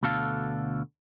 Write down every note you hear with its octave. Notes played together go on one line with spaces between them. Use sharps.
D2 B2 D3 A4 F5